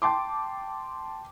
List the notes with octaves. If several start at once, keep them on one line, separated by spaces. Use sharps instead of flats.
G5 A5 C6 D6